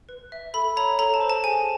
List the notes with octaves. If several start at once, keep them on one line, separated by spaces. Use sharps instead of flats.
B4
E5
A4 B5
C#5 A#5
A4 A#5
A5
C5
A5
G#4 G#5